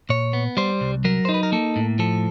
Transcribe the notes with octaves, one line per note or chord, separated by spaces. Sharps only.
A#2 C#5
B3
G3 C5
C2
F#3 A#4
C5
D#4
B4
A#4
A#3 A4
A2
F3 A4